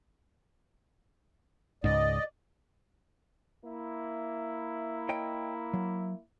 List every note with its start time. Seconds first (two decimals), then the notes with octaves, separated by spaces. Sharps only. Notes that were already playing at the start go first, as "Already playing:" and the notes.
1.84 C#2 G#2 D5 D#5
3.65 A#3 E4
5.09 C#5 D#5 G5
5.74 F#3